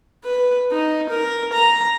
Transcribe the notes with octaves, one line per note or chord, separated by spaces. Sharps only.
B4
D#4
A#4
A#5